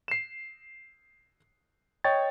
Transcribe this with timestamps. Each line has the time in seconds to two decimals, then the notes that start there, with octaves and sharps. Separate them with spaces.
0.08 C7 E7
2.04 C#5 D#5 G5 C#6 G#6 A6